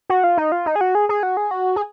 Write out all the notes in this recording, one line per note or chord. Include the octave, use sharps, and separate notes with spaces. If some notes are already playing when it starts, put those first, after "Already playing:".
F#4
F4
D#4
F4
D#4
G#4
F#4
G#4
G#4
F#4
G#4
F#4
G#4